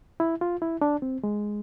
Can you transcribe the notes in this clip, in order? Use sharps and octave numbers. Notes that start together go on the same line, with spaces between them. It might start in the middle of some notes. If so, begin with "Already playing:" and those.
E4
F4
E4
D4
C4
G#3